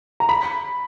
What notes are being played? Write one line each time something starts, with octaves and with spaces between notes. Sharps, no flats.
A#5
B5